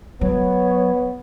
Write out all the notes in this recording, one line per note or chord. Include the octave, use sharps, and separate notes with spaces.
F#3 B3 C#5